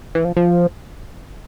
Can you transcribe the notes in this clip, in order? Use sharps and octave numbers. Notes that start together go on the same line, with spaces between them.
E3
F3
F3